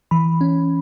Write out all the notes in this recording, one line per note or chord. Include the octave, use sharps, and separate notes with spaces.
E3 B5
C#4